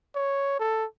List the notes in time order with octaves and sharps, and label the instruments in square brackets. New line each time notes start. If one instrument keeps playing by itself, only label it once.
[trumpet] C#5
A4